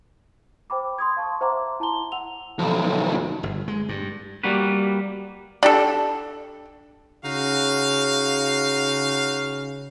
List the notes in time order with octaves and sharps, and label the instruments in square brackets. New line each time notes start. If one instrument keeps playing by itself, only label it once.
[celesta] C5 G5 B5 D6
C6 D#6 G#6
F5 A5 C#6
C5 E5 F#5 A#5 C6 D6
E4 A5 A#5 C6 G7
F#5 E6 F7
[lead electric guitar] B1 F2
[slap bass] G1
G#3
G2
[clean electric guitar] G3 A#3 F#4 G4 B4
[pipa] D4 G4 A4
[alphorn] C#3 [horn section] D#4 F#4 F5